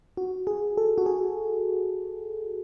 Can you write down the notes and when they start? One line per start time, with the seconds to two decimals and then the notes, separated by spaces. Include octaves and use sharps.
0.17 F#4
0.47 G#4
0.77 A4
0.98 F#4
1.06 G#4